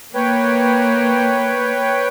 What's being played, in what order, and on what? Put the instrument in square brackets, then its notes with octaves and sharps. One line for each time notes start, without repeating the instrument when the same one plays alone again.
[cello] A#3 [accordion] B4 C#5 G5